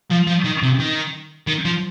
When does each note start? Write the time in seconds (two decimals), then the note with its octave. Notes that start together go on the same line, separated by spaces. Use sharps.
0.11 F3
0.27 F3
0.45 D#3
0.62 C3
0.80 D#3
1.47 D#3
1.65 F3